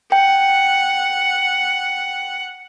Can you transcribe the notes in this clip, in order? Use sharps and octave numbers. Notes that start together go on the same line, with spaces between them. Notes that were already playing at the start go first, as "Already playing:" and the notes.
F#5 G5